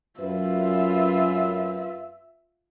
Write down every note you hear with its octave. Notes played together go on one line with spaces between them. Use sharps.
F#2 F4 B4 E5